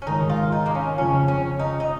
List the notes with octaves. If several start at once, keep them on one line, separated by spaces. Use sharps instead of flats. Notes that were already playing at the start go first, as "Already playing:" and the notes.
C#4
G#2 D#3 G#3 D#4
F4
D#4
A#3
C#4
F2 C#3 F3 C#4
C#4
D#4
D#4